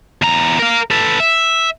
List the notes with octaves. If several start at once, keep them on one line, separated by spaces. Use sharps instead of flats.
E2 A#5
A#4 F5
A4 B4
E5